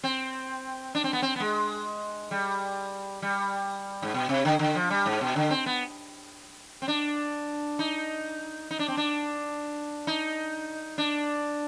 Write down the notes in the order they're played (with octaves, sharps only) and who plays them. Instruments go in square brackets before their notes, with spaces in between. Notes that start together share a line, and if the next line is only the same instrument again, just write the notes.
[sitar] C4
D4
C4
B3
C4
B3
G#3
G3
G3
G#2
B2
C3
D3
D3
F3
G3
G#2
B2
D3
C4
B3
C4
D4
D#4
D#4
D4
C4
D4
D#4
D4